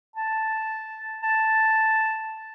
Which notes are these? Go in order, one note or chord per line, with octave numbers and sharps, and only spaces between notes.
A5
A5